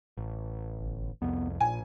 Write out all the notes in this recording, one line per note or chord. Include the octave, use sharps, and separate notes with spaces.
A1
G1
C2 F2 B3
A#1 A#2 G#5